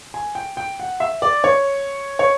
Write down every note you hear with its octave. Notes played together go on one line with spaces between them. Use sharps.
G#5
G5
G5
F#5
E5
D5
C#5
C#5